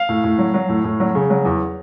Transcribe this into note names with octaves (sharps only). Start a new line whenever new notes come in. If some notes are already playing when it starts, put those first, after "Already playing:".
Already playing: F5
A2
A2
F#3
F#3
A2
A2
F#3
C#3
F#3
E2